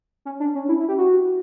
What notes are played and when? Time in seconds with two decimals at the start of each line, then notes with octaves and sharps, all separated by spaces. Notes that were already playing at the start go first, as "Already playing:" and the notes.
0.25 C#4
0.40 D4
0.55 C#4
0.69 E4
0.79 E4
0.89 G4
0.98 F#4